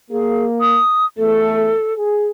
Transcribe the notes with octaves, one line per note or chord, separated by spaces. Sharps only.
A#3 G#4
D#6
E2 A3 A4
G#4